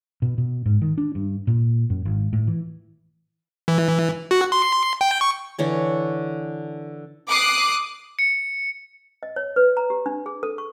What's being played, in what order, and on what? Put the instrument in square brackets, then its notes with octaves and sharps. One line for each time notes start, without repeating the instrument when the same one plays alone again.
[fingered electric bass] B2
B2
G#2
D#3
D4
G2
A#2
F#2
G#1
A2
E3
[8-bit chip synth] E3
F#4
C6
G5
C#6
[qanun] D3 E3 C#5
[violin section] D6 D#6 F#6 C7
[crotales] C#7
[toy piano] D#5
C#5
B4
A#5
G4
D4
G#4
A4
C#6